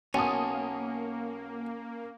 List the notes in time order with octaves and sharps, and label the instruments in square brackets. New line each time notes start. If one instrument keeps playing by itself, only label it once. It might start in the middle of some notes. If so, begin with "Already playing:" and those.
[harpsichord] B1 [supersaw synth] A#3 [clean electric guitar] C#4 [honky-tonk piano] G#5 A5 D#6